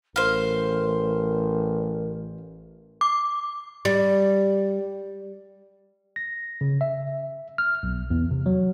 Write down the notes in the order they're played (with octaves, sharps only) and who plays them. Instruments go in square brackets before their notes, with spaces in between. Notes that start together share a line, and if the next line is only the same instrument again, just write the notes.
[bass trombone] A1 [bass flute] A#4 [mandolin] C5 F5
[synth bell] D6
[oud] G3
[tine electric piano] A#6
C#3
E5
F6
B1
E2
C3
F#3